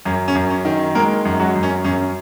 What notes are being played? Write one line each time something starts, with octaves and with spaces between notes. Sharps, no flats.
F#2 C#4
C#4
F#2
C#4
D#3
G#3 A#3 A#4
F#2
F#3 F#4
F#2
C#4
F#2 C#4